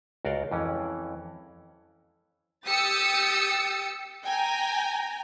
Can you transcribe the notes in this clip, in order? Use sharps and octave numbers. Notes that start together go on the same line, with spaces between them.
C#2 F#4 A#4 D5 F5 G5
F2 E3 C#4
G4 G5 D#6 E6 A6 C#7
G5 G#5 A#5